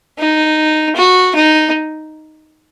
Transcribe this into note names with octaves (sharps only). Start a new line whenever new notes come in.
D#4
F#4
D#4